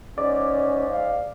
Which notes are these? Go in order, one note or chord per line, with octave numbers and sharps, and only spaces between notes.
G#2 C#4 D5
F5